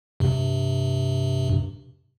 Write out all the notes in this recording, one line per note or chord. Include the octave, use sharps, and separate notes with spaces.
G2 C3